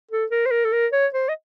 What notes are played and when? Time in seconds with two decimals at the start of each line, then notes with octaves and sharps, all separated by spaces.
0.11 A4
0.31 A#4
0.46 C5
0.51 A#4
0.65 A4
0.73 A#4
0.92 C#5
1.14 C5
1.29 D#5